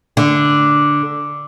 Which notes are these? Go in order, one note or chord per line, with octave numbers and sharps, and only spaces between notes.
D3